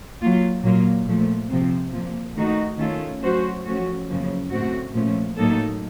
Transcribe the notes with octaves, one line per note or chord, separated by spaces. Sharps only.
F#3 A#3 F4
A#2 F#3 A#3 F4
A#2 F3 A3
C3 F3 C4
A#2 F3 A#3
D#3 A3 D#4 F#4
D#3 A3 C#4 F4 A4
F#3 A3 C#4 F#4 C5
F3 A3 C#4 F#4
F#2 C#3 F3 A#3
A2 A3 C4 F#4
A#2 F3 A3 C#4
A2 F#3 A#3 D#4 A4